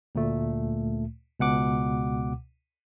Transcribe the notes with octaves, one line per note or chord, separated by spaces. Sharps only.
D2 A#2 A3
C#2 B2 F#5 D6